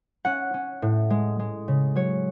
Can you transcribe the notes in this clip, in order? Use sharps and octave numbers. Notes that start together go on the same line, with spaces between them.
C#4 F#5
C#4
A2
G#3
G#3
C#3
F#3 C#5